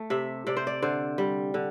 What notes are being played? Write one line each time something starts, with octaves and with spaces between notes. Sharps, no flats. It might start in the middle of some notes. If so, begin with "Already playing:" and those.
Already playing: A3
C3 E5
C3 D5
C5
D5
D3 C5
G3
D3